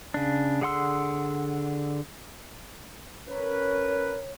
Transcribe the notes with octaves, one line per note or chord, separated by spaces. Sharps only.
C#3 D4
D3 G#4 F#5 C6 E6
C#4 A#4 B4 C#5